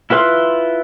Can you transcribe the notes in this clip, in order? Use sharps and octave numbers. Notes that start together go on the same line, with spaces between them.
E4 F4 B4 C6